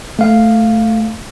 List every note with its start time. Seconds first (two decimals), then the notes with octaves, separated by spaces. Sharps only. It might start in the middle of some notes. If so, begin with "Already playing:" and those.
0.19 A3 F5